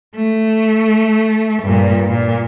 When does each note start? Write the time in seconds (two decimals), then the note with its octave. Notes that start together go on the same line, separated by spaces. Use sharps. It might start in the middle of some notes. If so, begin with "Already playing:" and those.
0.16 A3
1.63 G2 A#2
2.10 A#2